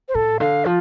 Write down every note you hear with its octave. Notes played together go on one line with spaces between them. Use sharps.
C5
A2 A4
D3 F5
F3 F4